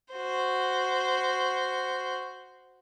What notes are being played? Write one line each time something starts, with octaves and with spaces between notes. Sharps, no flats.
F#4 C5